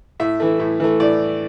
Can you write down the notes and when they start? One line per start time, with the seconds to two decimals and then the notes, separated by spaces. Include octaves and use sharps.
0.20 A2 E5
0.40 E3 A3
0.60 A2
0.80 E3 A3
1.00 A2 D5